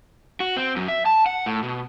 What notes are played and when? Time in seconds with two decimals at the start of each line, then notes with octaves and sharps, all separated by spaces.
0.40 F#4
0.57 C4
0.76 F#2
0.88 E5
1.06 A5
1.26 F#5
1.46 A2
1.63 B2